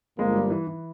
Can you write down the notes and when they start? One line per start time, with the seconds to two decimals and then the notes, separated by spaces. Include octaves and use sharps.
0.18 G1 G2 F3 G#3 A#3
0.35 G3
0.50 E3
0.67 E3